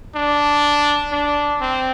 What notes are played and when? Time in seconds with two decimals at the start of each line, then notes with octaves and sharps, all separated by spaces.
0.15 D4
1.12 D4
1.61 C4